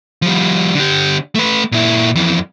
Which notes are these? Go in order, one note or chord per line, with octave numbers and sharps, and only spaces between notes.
F3 G3
D3 G4
A3 B4
A#2 E4
F2 E3